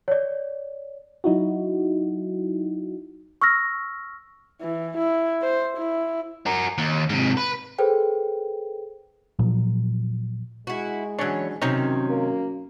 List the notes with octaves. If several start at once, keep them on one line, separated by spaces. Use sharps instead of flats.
C#5 D5
F#3 D#4 E4 F#4
C#6 E6 F6 A#6
E3
E4
C5
E4
F#4 A#4
D#2
G#2 C3
B4
G#4 A4 B4 C5 G5
A#2 F3 F#3
G#3 E4 F#4
E3 F#3 C#4 D4 C#5
F#2 C3 D#3 C4 C#4 D#4 C#5
A#3